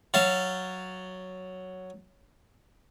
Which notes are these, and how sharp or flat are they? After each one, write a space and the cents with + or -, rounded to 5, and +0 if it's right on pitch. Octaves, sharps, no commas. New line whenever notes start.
F#3 +0 F5 -20 A5 +0